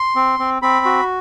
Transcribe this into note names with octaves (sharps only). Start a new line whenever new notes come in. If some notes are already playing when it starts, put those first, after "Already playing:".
Already playing: C6
C4
C4
C4 B5
F#4